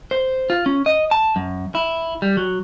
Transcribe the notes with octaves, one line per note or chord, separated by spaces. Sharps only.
C5
F4
C#4
D#5
A5
F#2
E4
G3
F#3